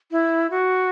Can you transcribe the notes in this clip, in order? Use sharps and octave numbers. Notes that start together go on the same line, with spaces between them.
E4
F#4